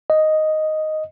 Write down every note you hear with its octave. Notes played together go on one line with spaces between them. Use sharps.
D#5